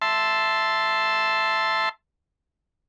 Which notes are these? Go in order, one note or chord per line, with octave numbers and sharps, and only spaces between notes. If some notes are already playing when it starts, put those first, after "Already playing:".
E5 A5 C6